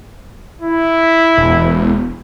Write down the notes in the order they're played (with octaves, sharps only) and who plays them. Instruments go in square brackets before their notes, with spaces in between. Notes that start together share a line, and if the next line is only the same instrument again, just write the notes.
[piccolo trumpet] E4
[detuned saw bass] E1